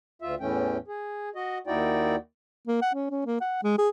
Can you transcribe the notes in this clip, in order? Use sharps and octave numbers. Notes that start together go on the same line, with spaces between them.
D2 F4 E5
E2 A2 E3 A3 C#4 G5
G#4
F#4 D#5
D#2 D#4 E4 F#4 D5 G5
A#3
F#5
C#4
C#4
A#3
F#5
G#3
G#4